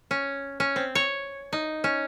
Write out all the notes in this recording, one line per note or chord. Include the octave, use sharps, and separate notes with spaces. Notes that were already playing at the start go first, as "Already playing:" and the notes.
C#4
C#4
C4
C#5
D#4
C#4